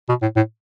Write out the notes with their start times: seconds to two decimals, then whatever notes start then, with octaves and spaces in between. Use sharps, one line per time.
0.09 B2
0.22 A2
0.36 A2